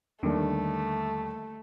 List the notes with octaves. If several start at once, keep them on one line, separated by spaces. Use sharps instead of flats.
D#2 D3 G3 A3